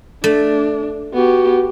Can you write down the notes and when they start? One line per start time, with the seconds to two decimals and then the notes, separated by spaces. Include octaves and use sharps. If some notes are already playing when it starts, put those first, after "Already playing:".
0.24 A3 D4
1.14 B3 F#4 G4